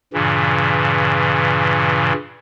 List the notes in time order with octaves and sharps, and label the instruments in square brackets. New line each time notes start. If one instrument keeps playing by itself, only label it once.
[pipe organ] G2 A#2 C#3 E3